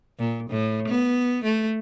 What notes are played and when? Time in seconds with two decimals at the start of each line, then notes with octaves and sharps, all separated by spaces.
0.19 A#2
0.50 A2
0.88 B3
1.45 A3